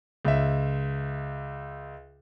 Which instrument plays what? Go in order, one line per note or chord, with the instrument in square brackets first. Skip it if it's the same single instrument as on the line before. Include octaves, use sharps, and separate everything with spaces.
[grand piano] C#2 E5